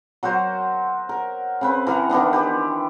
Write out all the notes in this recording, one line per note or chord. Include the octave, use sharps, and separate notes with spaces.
F#3 F#4 A#4 C5
A#4
C#3 C4 B4
E3 A#4 F#5
D#3 E3 B3 D4
G4 B4 C5